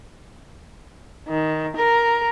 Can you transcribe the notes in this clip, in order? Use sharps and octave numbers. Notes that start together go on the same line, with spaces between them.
D#3
A#4